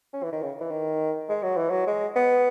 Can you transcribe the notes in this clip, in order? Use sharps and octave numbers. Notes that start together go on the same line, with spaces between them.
C#4
E3
D#3
C#3
E3
D#3
G#3
F#3
E3
F#3
G#3
B3